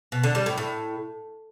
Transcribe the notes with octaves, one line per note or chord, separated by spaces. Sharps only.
B2
D3
G3
A2
A2